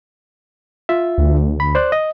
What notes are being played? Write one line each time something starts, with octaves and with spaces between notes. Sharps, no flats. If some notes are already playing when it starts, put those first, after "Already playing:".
F4 E5
D2
B5
C5 D5 F#6
D#5